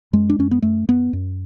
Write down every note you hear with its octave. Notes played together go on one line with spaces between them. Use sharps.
F#2 G#3
D4
F#2 C#4
B3
F#2 A3
F#2 B3
F#2